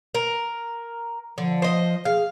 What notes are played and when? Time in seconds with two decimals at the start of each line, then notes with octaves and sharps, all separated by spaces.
0.15 A#4
1.38 D3 F3
1.62 C5 D#5
2.05 G#4 F5